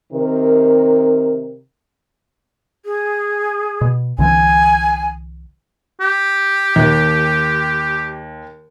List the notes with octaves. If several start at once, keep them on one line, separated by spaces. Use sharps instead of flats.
C3 D#3 A#4
G#4
B2
C2 D3 E3 G#5
G4
D#2